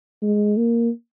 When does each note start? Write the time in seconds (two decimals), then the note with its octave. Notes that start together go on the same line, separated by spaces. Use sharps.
0.22 G#3
0.57 A#3